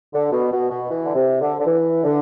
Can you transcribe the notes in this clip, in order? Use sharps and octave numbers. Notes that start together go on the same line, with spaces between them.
D3
B2
B2
B2
E3
D3
C3
D3
D3
E3
D3